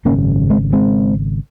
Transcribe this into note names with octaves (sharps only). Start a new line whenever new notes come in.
G#1 F#2 C#3 A#3 C#4
G#3 C4
G#3 C4